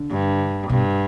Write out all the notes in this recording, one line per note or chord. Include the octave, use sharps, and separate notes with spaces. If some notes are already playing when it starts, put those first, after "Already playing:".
Already playing: D3
G2
G2 B2